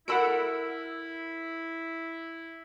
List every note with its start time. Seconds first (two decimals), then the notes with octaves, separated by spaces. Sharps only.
0.08 E4 A4 A#4 F#5 B5 E6 D7